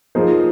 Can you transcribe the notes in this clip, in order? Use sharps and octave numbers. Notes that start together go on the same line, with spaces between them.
F3 A#3 D#4 G#4 C5